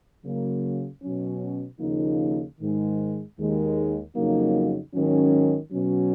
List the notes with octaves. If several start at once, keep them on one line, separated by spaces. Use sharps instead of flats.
C#3 F#3 A#3
B2 F#3 C#4
D#2 C#3 F3 A#3 D#4
G#2 D#3 G#3
D#2 D#3 G#3
F2 C#3 F#3 A#3 D#4
G#2 D#3 F#3 C#4
B2 F#3 C#4